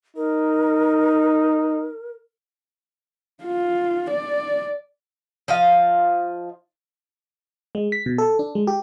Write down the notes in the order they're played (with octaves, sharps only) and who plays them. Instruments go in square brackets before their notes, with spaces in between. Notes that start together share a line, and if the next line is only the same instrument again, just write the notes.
[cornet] D#4 [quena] A#4
[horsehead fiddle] F4
D5
[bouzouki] F3 D#5 F5
[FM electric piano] G#3
B6
B2
A4
D4
G#3
G4